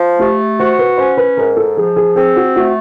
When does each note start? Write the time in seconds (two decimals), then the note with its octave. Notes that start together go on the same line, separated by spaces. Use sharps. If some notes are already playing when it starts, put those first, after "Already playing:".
Already playing: F3
0.19 A3 G4
0.59 F#4 C5
0.79 B4
0.98 C#4 C5
1.17 B4
1.37 G#2 A#4
1.57 A4
1.77 F3 G#4
1.96 G#4
2.16 C4 G#4
2.36 F#4
2.55 A3 F#4